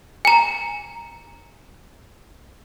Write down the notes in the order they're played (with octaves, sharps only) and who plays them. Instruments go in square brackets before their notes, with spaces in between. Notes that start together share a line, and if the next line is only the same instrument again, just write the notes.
[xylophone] G#5 A#5